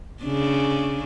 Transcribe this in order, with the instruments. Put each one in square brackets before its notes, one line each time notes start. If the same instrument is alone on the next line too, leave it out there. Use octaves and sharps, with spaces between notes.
[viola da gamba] C#3 D4